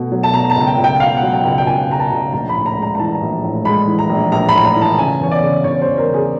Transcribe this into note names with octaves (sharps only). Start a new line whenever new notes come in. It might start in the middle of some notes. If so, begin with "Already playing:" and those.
Already playing: B2 A3
F#3
A5
B2 A#5
A5
C#2
G5
C#2
G5
B2 F5
F#5
F#3
G5
C#2
G5
C#2 G#5
C#2 A#5
A5
C#2
A#1 A#5
B5
A2
A#5
G#3
A#5
A#5
E3 A5
A#1
A2
G#3 B5
E3
A#5
A#1
A#1 A#5
B5
A2
A#5
E3
A5
C#3 G#5
E2 C#5
D5
C#3
E2 C#5
C5
E2
A#4
C#3 G#4